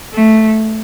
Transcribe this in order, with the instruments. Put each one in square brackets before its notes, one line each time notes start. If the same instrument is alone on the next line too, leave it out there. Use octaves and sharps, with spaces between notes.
[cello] A3